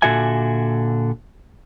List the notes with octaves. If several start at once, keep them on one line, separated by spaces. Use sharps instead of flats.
A#2 D3 F#4 A4 E5 G#5